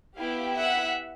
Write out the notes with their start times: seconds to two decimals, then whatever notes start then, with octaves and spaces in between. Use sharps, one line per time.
0.18 B3 E4 G4 F5 G5
0.57 E5 F#5